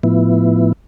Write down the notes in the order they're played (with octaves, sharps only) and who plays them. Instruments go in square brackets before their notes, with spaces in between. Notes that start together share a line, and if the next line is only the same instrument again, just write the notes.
[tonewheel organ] A2 F3 B3 E4